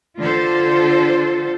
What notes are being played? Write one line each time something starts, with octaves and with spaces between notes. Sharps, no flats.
D3 F4 A4 C5